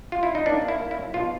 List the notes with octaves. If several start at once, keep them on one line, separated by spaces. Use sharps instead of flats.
F4
E4
D#4
A#3 D4
A#3
E4
A#3
E4
F#3
B2 F4